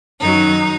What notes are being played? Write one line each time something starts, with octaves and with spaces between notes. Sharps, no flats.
F#2 D#3 F#3 D#4